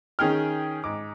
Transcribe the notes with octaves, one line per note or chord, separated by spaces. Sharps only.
D#3 C#4 G#4 G5 F6
G#2 D6